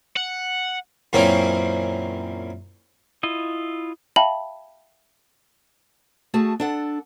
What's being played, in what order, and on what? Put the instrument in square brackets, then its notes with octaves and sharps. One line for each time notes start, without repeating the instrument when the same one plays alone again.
[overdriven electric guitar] F#5
[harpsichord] F#2 A#2 E3 A#3 C4 C#4
[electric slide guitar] E4 F4 D#5
[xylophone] E5 F5 G5 A5 B5 F#7
[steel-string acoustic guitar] A3 F#4 G#4 A5
D4 A4 F#5